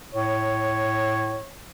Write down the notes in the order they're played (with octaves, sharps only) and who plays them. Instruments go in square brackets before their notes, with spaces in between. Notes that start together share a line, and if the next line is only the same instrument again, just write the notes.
[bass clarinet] A2 [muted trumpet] C#5